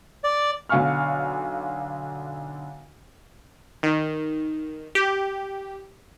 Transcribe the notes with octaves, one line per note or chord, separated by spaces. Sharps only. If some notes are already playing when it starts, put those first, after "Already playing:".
D5
B1 D3 F5 G#5 C#6 F6
D#3
G4